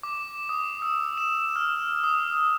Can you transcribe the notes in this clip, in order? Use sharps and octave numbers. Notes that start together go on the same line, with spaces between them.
D6
D#6
E6
E7
F6
D#6